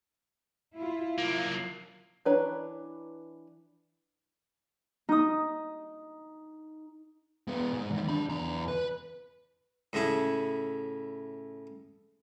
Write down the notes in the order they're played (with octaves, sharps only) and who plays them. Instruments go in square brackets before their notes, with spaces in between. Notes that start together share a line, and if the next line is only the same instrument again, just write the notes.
[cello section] E4 F4
[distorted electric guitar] F#3 A#3
[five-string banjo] E3 D4 B4 C#5 A#5
[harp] D#4 D#6
[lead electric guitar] G#3 B3
G#2 G#3
E2 D#3
D4 B5
E2 A#5
B4
[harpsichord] A2 C#3 E4